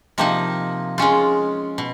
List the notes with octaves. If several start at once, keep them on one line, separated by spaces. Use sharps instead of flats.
C3 F3 A#3 D#4
G#3 C#4 F4
B2